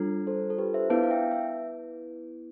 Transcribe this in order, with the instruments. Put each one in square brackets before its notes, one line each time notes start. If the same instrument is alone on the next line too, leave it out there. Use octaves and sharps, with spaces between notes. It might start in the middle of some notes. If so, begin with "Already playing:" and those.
Already playing: [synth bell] G3 D4 F4 A4
[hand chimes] A4 C5
A4
G4 B4
C5 E5
[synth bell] B3 E4 B4 [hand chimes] F5 A5
[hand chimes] F5
E5 G5
E5